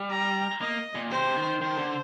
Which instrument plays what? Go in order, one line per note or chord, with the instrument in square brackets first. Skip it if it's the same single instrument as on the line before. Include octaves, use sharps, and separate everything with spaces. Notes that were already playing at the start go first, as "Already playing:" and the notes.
Already playing: [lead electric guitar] G3
[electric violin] A#5
[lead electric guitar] A#3 [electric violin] D#5
[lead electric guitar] A#2
[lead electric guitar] C3 [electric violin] C5
[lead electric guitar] D#3
[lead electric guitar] D#3 [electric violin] C5
[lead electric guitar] D3